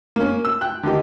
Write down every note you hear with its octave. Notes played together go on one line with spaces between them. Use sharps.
A#3 C#4
E6
G5 F#6
D3 D#3 D#4 G4